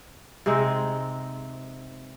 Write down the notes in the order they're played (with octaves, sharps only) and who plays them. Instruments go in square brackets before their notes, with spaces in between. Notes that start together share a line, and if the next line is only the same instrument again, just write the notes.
[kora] C3 G#3 C4 D#4